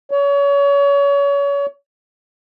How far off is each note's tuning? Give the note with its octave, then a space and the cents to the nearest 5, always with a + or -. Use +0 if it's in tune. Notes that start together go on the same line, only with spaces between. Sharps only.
C#5 +30